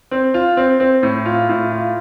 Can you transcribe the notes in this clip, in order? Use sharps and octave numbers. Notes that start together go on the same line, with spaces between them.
C4
F4
C4
C4
A2
F4
A2
F4